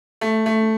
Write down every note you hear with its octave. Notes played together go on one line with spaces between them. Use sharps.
A3
A3